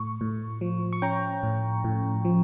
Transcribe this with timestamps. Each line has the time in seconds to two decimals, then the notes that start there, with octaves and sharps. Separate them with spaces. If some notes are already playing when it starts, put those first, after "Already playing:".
Already playing: A2 C#6
0.21 A2
0.61 F3
0.93 C#6
1.02 C#4 G5 A#5
1.43 A2
1.84 A2
2.25 F3